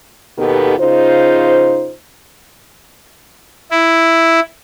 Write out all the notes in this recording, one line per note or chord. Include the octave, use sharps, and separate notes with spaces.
D#2 B2 D#3 B3 G4 A4
C#3 D#4 F4 C5
E4